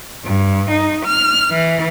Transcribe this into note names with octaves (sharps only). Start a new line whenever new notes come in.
G2
D#4
F6
E3